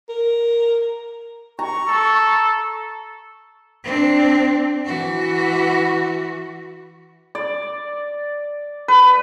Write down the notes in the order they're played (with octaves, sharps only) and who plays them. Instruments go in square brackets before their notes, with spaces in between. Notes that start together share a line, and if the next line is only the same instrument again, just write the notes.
[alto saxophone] A#4
[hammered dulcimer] A#5 [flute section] C#6
[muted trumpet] A4
[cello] C4 D4
E3 F#4
[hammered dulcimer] D5
B4